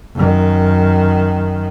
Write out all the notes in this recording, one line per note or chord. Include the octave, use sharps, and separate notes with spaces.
F#2 D#3